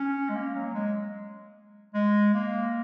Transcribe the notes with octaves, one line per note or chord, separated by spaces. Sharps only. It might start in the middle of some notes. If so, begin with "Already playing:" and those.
Already playing: C#4
G#3
A#3
F#3
G#3
G#3
A#3